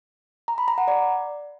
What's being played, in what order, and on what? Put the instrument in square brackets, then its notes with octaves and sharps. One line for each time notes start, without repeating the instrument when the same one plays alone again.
[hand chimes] A#5
B5
A#5
F#5
D5